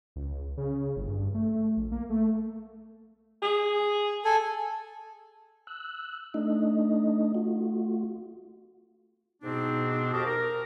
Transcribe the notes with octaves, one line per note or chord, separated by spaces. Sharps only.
C#2
C#3
G1
G2
A3
A#1
A#3
A3
G#4
A4 G#5
E6 F#6
A3 D4 D#4 D#5
A3 F4 F#4
G#2 B2 B3 C4 D4 D#4
F2 F#4 G4 F5 A5 D#6
A#4